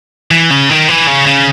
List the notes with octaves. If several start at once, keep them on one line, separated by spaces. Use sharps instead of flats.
E3
C#3
D#3
E3
C#3
C#3